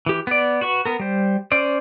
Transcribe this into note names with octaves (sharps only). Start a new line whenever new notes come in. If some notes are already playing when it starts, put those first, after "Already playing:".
E3 G4
B3 D5
F#4 B4 C#6
B3 A#4
G3 C5
C#4 C5 D5